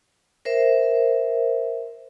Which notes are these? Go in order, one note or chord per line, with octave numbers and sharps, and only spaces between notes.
A#4 C5 E5